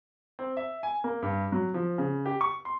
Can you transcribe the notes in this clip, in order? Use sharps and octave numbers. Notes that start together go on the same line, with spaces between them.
C4
E5
G#5
A#3
G2
F#3
F3
C#3
G4
C#6
C6